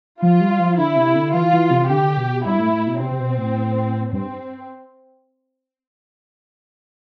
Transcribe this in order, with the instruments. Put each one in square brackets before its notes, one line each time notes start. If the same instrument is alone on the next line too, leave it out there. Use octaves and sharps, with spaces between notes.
[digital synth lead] F3 [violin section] F4
[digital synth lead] G3
F3
[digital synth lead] D3 [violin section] E4
[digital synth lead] C3
D3
[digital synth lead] E3 [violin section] F4
[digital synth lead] E3
C3
[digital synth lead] D3 [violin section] G4
[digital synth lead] B2
[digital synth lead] G2 [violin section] E4
[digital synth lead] A2
A2
B2
[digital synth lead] C3 [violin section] C4
[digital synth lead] C3
B2
A2
[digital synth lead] G2 [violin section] C4